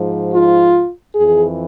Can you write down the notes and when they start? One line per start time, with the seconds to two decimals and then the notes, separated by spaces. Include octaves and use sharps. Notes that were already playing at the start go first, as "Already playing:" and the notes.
Already playing: G#2 F3
0.34 F4
1.15 F2 E3 G#4